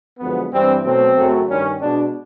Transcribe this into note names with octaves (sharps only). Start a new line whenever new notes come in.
F#2 D3 F3 G#3 B3
G2 E3 G3 C4
B2 F#3 A3 C4
F#2 C#3 F#3 A3
G2 D#3 G3 C#4
B2 G#3 D4